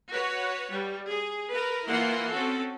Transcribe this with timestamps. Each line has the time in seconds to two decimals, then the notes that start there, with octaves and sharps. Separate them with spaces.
0.12 F#4 B4 C#5 F#5
0.73 G3
1.07 G#4
1.51 A#4 B4
1.88 E3 A#3 E4 F4 F#5 C6
2.30 C4 C#4 F#4 A4